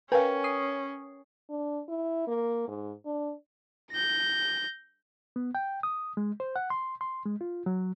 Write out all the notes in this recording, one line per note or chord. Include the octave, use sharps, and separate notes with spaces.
C#4 A#4 B4 F5 G5 G#5
D#6 C7
D4
E4
A#3
G#2
D4
G6 A#6
B3
G5
D#6
G#3
C5
F#5
C6
C6
G#3
F4
F#3